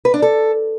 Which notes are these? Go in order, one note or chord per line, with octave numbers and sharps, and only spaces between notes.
B4
D4
A4